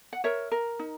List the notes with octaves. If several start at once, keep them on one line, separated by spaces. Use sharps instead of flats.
F#5
A#4 C#5 E5
A#4
D#4